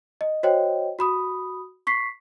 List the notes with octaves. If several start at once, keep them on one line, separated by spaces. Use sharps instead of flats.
D#5
F#4 C5 C#5 D#5 G5
F#4 B5 D#6
C#6 B6 C7